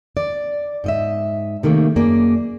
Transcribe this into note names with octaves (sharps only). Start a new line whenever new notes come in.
D5
G#2 D#5 E5
C3 D#3 A3 A#3
F#2 A#3 G#4 D5